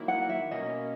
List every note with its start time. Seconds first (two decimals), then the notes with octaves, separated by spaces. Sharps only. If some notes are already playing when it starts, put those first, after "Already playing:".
Already playing: D#3 F#3 A#3 E4
0.08 F#5
0.29 E5
0.51 B2 A#3 C#4 D#5